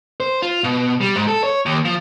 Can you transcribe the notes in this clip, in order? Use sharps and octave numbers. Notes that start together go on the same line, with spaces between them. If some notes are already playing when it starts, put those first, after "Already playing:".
C5
F4
B2
G3
G#2
A4
C#5
D#2
F3